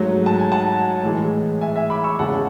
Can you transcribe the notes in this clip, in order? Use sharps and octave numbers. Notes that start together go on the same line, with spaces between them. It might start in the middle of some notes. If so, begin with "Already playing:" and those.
Already playing: G#2 F#3 A3
A5
G#5
F#5 A5
A2 E3 G#3
E5 G#5
E5 G#5
B5 D6
C#6 E6
E2 C#3 G#3 F#5 A5